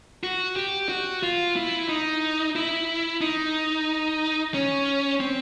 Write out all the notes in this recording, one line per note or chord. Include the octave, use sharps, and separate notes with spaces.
F#4
G4
F#4
F4
E4
D#4
E4
D#4
C#4
C4